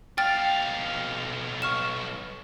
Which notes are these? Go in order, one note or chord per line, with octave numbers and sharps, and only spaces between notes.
B1 F5 G5 F6 A6
C#6 F6 E7